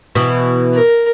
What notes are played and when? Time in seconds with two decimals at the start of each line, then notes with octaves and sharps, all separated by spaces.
0.15 B2 E3
0.73 A#4